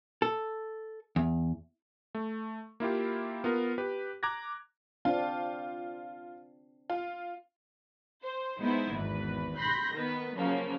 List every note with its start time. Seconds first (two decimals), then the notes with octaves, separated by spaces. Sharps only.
0.22 A4
1.16 E2
2.15 A3
2.80 A#3 E4 F4 G4
3.44 B3 F4 A#4
3.78 G4 B4
4.23 A#5 D6 F#6 G#6 A#6
5.05 C4 D4 F4
6.90 F4
8.23 C5
8.60 G#3 B3 D#4 E4 C5
8.92 G#1 E2 B4
9.57 B5 C6 F#6 G6 A#6
9.93 D#3 B3 B4
10.36 C#3 F3 F#3 A#3 C#4